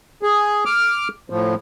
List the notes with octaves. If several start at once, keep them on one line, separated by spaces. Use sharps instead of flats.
G#4
D6 F6
A2 F3